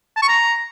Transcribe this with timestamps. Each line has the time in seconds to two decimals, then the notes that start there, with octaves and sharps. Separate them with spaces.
0.16 A5
0.22 C#6
0.28 A#5